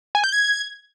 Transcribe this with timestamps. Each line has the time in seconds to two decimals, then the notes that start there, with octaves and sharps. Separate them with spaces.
0.15 G#5
0.24 G6
0.33 G#6